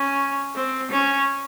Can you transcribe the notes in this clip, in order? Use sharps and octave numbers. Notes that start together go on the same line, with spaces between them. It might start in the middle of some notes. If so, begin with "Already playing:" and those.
Already playing: C#4
C4
C#4